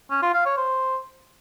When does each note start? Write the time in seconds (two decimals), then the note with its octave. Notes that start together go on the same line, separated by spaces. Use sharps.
0.11 C#4
0.22 F4
0.34 F5
0.46 C#5
0.57 C5